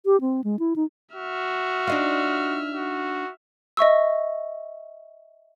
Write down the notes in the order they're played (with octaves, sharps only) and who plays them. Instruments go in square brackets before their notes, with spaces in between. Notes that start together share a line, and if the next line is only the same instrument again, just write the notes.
[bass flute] G4
C4
G#3
E4
D#4
[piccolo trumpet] F#4 [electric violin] E5 F6
[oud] D4 D#4 F4
[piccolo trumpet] F#4
[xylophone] D#5 E5 C#6 E6